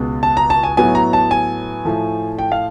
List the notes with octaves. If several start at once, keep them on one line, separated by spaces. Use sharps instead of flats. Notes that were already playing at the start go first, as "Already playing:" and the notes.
Already playing: C#2 B2 G#3
A5
A#5
A5
G#5
A2 F#3 B3 G#5
A#5
A5
G#5
A2 F3 A3
G5
F5